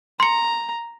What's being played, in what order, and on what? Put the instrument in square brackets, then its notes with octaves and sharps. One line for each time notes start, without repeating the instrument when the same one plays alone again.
[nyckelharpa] A#5 [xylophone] C6 C#7